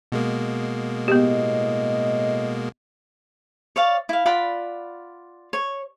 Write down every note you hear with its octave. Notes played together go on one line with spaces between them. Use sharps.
B2 G#3 A#3
A2 B3 G4 D#5
C#5 D5 F5
E4 F5
F4 D5 F#5 B5
C#5